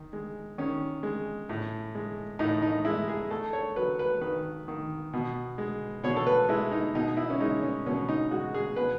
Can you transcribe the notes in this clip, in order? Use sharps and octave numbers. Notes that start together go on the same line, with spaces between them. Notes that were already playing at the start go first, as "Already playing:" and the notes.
Already playing: D#3
G#3
D#3 C#4
G#3
A2
G#3
A2 D#4
D#4
G#3 E4
G#4
A3 A4
C#5
F#3 B4
B4
D#3 B4
D#3
B2
G#3
B2 C#5
A4
B4
G#3 E4
D#4
B2 D#4
E4
C#4
G#3 D#4
C#4
B2 C#4
D#4
G#3 F#4
G#4
B2 B4